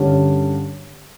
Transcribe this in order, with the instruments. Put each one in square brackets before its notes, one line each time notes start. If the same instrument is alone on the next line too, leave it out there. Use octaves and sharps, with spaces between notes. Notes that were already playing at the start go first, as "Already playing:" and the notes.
Already playing: [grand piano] G2 D3 G3 C#4